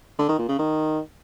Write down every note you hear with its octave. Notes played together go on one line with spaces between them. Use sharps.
D3
D#3
A#2
C#3
D#3